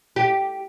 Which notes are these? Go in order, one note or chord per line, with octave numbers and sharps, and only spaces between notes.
G4